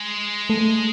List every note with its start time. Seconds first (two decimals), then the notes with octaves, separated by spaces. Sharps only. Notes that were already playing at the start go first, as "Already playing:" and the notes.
Already playing: G#3
0.50 A3